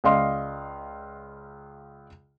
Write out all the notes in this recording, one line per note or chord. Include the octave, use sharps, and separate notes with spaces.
C#2 D5 D#5 F5 C6